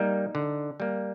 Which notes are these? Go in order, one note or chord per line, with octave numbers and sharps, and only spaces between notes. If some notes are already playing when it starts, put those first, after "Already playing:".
Already playing: G3 A#3 D#4
D3
G3 A#3